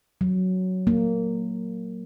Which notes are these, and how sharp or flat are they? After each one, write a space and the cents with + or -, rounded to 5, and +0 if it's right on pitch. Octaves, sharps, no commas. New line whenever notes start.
F#3 +5
A#3 -15